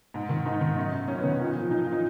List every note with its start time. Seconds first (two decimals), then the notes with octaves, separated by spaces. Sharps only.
0.14 G#2
0.29 D#3
0.45 G#2 D#4
0.61 D#3
0.76 F#2
0.92 D#3
1.08 F#2 C#4
1.18 B3
1.24 D#3
1.29 B3
1.39 A#2 D#4
1.55 F3
1.70 A#2 D#4
1.86 F3
1.92 D#4